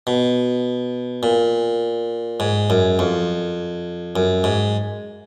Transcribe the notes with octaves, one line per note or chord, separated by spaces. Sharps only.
B2
A#2
G#2
F#2
F2
F#2
G#2